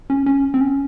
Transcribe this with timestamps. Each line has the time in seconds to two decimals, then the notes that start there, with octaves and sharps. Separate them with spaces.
0.10 C#4
0.26 C#4
0.54 C4
0.61 C#4